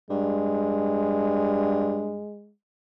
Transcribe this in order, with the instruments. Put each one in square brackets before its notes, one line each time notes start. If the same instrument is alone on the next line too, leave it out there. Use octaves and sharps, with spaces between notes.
[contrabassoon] G2 [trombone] G#3